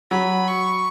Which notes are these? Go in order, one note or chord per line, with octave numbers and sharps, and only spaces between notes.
F#3 B5
C#6